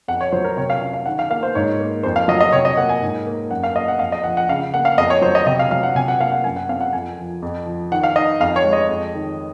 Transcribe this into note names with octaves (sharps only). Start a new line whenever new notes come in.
F2 F#5
C#5
F#3 C5
A#4
C3 C#5
F5
C#4 F5
F5
D#3 F#5
F5
A#3 F5
C5
G#2 C#5
A#3
F2 C5
F5
F#3 D#5
D#5
C3 C#5
D#5
A#3 F#5
G#5
G#2
A#3
F#2 F#5
F5
A#3 D#5
F#5
F2 F5
D#5
F3 F#5
F#5
C#3 F5
A#3 F#5
F5
F2 D#5
C#5
F#3 C5
D#5
C3 D#5
F5
F#3 F5
F#5
C3 G#5
F#5
A#3 F5
F#5
F#2 G#5
F#5
C4 F5
F#5
F2 G#5
F3
F2
F3
D#3 F#5
F5
D#4 D#5
F2 F5
C#5
G#3
D#5
F2
D#3